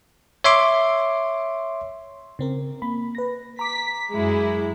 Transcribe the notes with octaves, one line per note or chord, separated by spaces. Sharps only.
C#5 E5 C6 D6
C#3 C4 A#4
A#3 B5
B4 A#6
A#5 D6 B6
F#2 G#3 E4